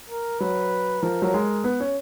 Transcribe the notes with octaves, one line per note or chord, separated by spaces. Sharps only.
A#4
F#3 B4
F3 A#4
F#3
G#3
B3
C#4